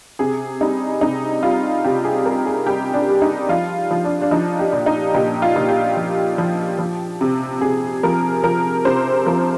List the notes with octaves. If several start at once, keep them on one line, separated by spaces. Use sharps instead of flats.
C3 G#4
G3 D#4
C3 D#4
G3 F4
C3 G4
G#4
G3 A#4
G#4
G3 G4
D4
G3
D#4
F3 F4
F3
D4
D4
F3 D#4
G4
A#2
D#4
A#2 G4
F4
A#2
G4
F3
F3
F3
C3
C3 G#4
F3 A#4
F3 A#4
C3 C5
F3 A#4